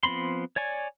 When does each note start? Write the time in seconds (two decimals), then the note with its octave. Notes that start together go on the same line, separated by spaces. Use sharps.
0.03 F3 B3 C4 B5 C6
0.56 C#5 D5 G#5 C#6